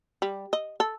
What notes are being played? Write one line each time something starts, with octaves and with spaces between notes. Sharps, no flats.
G3
D#5
A4